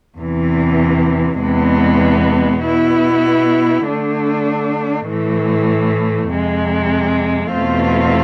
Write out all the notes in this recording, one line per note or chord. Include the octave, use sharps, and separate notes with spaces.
E2 C3 E3
E2 C3 G#3 B3
B2 B3 E4
D3 A3 D4
A2 E3 A3
F2 C3 G#3
E2 B2 A3 C4 F4